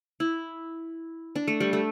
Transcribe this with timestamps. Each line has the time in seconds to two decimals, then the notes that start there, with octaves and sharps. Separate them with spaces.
0.20 E4
1.35 D4
1.48 A3
1.60 G3
1.73 A3